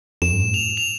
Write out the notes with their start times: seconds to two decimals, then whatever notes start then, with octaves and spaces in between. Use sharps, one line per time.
0.22 F2 E7
0.32 G2
0.42 A2
0.54 F7
0.77 F7